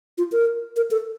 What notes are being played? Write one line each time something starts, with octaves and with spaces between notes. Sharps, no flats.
F4
A#4
A#4
A4